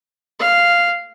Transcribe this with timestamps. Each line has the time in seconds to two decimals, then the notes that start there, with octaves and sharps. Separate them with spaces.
0.40 F5